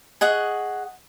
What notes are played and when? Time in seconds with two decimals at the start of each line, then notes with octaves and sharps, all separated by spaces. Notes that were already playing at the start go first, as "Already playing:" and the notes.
0.21 G#4 D#5 F#5 C#6